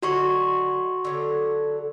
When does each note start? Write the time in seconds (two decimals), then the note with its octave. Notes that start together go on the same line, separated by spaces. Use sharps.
0.03 D3 F#3 D#4 F#4 C6 C#6
1.05 D3 F#3 A4